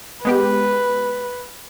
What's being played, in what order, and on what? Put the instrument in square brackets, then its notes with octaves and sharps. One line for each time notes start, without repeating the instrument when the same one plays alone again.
[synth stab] G#3 B3 G4 [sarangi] B4